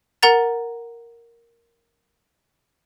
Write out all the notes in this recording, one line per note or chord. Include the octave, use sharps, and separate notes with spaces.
A#4 F#5 A#5 A6